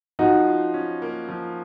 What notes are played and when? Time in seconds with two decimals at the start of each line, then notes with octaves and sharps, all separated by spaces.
0.19 F3 D#4 F#4
0.47 F4
0.74 C#4
1.02 A#3
1.29 F3